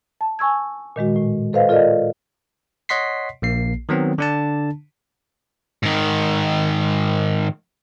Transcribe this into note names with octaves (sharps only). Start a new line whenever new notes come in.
A5
G#5 C#6 E6 G#6
A#2 D#3 G#3 F#4
A2
A4 B4 C5 D#5 F5
F4 A4 A#4 D5 D#5
C#5 D#5 F#5 C6 B6 C7
A#1 A#3 C7
D#3 F#3 B3 C4
D3 D4 A5
G#2 D#3